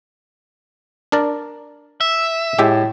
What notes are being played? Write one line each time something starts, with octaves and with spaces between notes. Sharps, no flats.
D4 A#4 D5
E5
A2 G#3 G4 E5